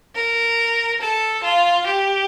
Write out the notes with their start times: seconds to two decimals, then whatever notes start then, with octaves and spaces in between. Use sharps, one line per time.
0.16 A#4
1.01 A4
1.43 F4
1.86 G4